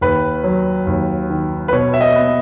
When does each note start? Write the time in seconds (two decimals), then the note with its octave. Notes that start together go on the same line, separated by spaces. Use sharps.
0.01 D#2 B4
0.44 F#3
0.87 D#2
1.30 D#3
1.68 B4
1.73 B2 C#5
1.93 E5
2.01 D#5
2.16 B3